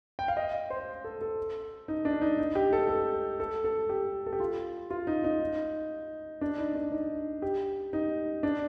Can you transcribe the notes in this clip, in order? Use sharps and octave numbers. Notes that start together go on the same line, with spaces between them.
G5
F5
D#5
C5
A4
A4
D#4
D4
D#4
D#4
G4
A4
A4
A4
A4
G4
A4
G4
F4
F4
D#4
D#4
D4
D#4
D4
D#4
G4
D#4
D4